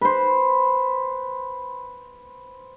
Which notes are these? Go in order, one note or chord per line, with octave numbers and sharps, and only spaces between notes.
B4 C5